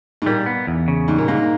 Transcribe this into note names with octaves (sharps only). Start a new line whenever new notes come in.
G#2
A#2 G3
B3
E2
C#3
G#2 G3
A#2
G#2 A#3